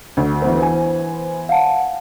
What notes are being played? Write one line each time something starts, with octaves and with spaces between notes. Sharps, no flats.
D2
E3 B3 C5
G#5
F5 F#5 A5